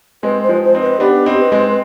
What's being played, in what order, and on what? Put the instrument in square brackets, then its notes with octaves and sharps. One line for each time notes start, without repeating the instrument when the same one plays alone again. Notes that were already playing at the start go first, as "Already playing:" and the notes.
[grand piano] G#3 C4 [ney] B4
[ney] C5
[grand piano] F3 G#3
[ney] C5
[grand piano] C4 D#4
[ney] B4
[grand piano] B3 D4 [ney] G4
[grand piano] C4 D#4
[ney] B4
[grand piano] G#3 C4